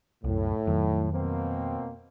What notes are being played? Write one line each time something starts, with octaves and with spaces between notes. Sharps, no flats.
C2 F#2 A2
F2 D#3 F#3
B2 A#3 C4